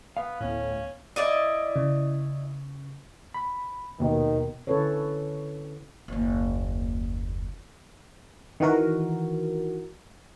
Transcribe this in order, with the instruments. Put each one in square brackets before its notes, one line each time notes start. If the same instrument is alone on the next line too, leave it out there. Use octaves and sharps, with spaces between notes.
[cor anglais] B3 [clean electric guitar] F5
[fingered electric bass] D1 B3 [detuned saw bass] A2 [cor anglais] C#4
[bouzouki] E4 D5 D#5
[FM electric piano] C#3
[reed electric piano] B5
[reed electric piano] D#2 B2 [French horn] D#3
[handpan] D3 C#4 E4 A4 B4 C#5
[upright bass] F#1 D#2
[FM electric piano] D#3 E3 F#4 A#4